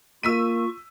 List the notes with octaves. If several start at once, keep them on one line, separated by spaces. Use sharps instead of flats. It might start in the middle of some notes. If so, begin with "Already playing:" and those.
A#3 F4 C#6 E6 B6 D#7